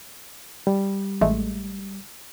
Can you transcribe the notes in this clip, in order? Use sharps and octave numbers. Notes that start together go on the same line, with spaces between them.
G3
A1 G#3 A3